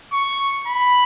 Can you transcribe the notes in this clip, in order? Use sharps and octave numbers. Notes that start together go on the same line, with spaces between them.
C#6
B5